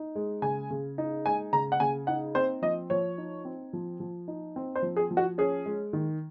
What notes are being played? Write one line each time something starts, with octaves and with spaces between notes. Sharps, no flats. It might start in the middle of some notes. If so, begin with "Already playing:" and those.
Already playing: D#4
G#3
C#3 G#5
C#3
D#4
G#3 G#5
C#3 A#5
F#5
C#3 G#5
D#4 F#5
C4 C5
F3 D#5
F3 C#5
D#4
C4
F3
F3
D#4
C4
C5
F3
G#4
F3
F#4
C#4 G#4
G#3
D#3